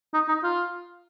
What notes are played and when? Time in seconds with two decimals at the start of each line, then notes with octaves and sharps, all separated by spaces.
0.14 D#4
0.29 D#4
0.43 F4